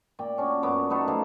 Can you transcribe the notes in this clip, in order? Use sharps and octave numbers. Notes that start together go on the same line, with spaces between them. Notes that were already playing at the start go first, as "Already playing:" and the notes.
A#2 D5 G5
C#4 D4 F#4
F#2 B3 D6
A3 B3 D#4 A4
F3 A#3 A4